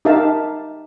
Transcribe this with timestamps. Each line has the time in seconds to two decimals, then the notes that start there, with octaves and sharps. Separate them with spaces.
0.05 D#4 G4 A#4 E5 F5 A5